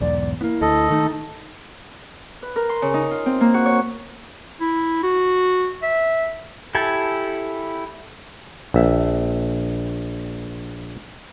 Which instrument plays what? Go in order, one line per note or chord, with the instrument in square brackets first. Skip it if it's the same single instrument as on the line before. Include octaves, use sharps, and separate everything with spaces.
[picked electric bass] B1 E2 G#2 [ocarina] D5
[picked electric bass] A#3 B3 [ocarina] E4
[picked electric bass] D2 [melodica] A4 D#5
[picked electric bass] D#3 A3 [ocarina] D#4
[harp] B4
A#4
C6
C#3
D#4
F4
C4
A#3
F#4
C#5
[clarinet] E4
F#4
E5
[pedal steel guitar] E4 G4 A4 G#5
[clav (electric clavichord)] A#1 E5